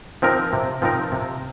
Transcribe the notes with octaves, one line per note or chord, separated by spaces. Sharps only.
F3 C4 D#4 A#4
C3
F3 C4 D#4 A#4
C3